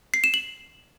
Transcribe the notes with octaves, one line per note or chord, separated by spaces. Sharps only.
C7
E7
F#7